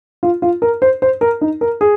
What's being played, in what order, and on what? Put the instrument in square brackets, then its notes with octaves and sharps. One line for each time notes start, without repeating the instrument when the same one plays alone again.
[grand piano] F4
F4
A#4
C5
C5
A#4
D#4
A#4
G#4